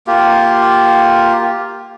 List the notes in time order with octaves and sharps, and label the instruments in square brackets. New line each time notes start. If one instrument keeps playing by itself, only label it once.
[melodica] A#3 F4 G4